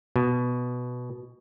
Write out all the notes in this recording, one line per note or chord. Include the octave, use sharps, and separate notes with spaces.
B2